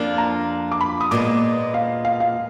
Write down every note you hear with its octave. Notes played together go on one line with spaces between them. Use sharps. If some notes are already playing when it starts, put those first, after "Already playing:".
Already playing: F2 F3 A#3 D4 F4
A#5
D6
B5
D#6
A#2 G#3 B3 D6
F5
F5
F5